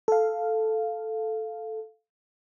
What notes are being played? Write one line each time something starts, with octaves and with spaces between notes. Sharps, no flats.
A4 F5